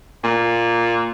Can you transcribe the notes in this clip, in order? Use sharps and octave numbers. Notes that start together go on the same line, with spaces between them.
A#2